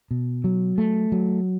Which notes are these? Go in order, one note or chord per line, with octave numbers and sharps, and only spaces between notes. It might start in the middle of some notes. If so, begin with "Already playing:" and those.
B2
F#3
A3
F#3